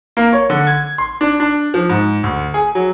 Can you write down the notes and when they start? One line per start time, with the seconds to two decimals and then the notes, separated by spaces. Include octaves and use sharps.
0.17 A#3
0.33 C#5
0.50 D3
0.67 G#6
0.98 C6
1.21 D4
1.40 D4
1.74 F3
1.89 G#2
2.24 D2
2.54 G#4
2.75 F#3